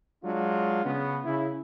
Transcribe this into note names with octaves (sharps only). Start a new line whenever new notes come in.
F#3 G#3 D4 F4
C#3 B3
C#3 E4